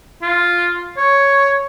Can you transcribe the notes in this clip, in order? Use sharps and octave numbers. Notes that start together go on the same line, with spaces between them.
F4
C#5